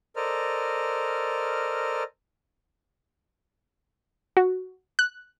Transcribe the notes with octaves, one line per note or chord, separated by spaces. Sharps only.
A4 A#4 C5 D5 D#5 F6
F#4
F#6